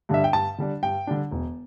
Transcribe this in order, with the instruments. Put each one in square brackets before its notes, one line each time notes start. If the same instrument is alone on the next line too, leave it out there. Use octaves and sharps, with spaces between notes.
[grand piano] G2 D3 G3 D4 E5
G5
G2 A5
D3 G3 D4
G2 G5
D3 G3 D4
E1